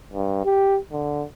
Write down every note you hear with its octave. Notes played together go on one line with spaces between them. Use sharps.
G2
G4
D3